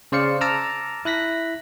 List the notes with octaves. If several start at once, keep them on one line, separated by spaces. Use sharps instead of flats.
C#3 C5 D5 F5 C#7
A5 A#5 D6 E6 F6
E4 F#6 A#6 B6